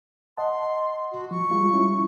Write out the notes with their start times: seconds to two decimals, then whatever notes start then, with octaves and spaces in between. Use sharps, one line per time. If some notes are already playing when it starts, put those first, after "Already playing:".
0.37 D#5 F#5 A5 C6
1.12 F#4
1.31 F3 C#6
1.51 G3 G#3 F4
1.74 G3 C#4 E4